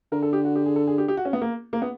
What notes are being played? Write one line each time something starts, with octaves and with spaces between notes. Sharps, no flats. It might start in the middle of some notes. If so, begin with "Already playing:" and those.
D3 A#4
A4
G4
F#4
G4
G#4
A4
G#4
G4
G4
F#4
C#4
B3
A#3
A#3
B3